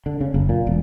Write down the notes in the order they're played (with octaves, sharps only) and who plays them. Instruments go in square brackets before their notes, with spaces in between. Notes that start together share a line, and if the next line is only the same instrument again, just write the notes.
[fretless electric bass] D3
C#3
F#1
A#2
E1